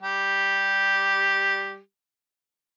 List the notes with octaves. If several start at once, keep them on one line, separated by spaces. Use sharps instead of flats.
G3 G4